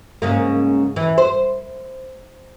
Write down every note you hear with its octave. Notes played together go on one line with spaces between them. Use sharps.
G#2 C#3 A#3
E3
C5